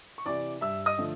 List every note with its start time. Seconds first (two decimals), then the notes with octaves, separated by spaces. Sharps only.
0.18 C#6
0.26 C3 E3 D5 D6
0.61 G2 E5 E6
0.86 D#5 D#6
0.98 D3 F3 A3